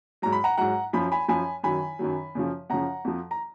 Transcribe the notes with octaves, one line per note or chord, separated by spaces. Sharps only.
G#2 F#3 A#5
B5
F#5 A#5
G#2 F#3 F#5 A#5
F#2 F3 B5
G#5 B5
F#2 F3 G#5 B5
F#2 D#3 F#3 G#5 B5
F#2 D#3 F#3
F#2 C#3 F3
F#2 C#3 F3 F#5 A#5
F2 F3
A#5